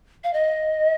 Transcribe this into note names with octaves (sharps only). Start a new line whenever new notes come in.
F5
D#5